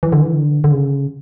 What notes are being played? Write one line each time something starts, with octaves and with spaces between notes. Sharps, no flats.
E3
D3
E3
D3
D3
C#3